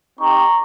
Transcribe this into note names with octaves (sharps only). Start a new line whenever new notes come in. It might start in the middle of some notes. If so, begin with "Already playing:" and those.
C4 D#4 G4 A#5 C#6